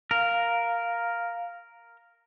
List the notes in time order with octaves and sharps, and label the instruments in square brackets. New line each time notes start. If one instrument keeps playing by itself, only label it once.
[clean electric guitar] A#4 [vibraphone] F5